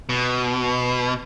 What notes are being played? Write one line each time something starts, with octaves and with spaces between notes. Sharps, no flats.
B2